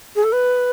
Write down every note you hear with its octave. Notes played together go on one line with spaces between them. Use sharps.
G#4
A4
B4